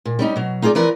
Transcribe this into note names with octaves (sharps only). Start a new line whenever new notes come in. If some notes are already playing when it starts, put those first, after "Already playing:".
A#2
G3 C#4 D#4
B2 F#3
D#4 F4 G#4 C5 D5
E3 F3 A#4 B4 D5